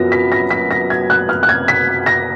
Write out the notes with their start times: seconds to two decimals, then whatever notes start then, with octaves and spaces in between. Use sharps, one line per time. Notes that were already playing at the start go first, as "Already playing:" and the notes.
Already playing: F#2 F3 B3 A#6
0.12 B6
0.32 A#6
0.51 B6
0.71 A#6
0.90 G#6
1.10 F#6
1.29 F6
1.43 F#6
1.49 G#6
1.68 B6
2.06 A#6